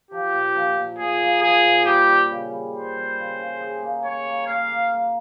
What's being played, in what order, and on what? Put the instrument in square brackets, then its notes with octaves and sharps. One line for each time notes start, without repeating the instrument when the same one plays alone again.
[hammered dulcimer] F3 [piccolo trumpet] G4
[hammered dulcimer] A#2
F3
A#2
[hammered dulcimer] A#2 [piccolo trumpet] G#4
[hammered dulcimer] A#3
[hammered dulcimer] F3 [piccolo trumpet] G#4
[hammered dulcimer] A#2
[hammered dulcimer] G3 [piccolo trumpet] G4
[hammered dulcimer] G3
C#3
G3
[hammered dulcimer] G3 [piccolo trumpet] C5
[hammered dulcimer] G3
C#3
C#3
G#4
A#3
[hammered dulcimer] A#3 [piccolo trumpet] C#5
[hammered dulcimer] A#3
[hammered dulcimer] A#3 [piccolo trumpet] F5
[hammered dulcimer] A#3
A#3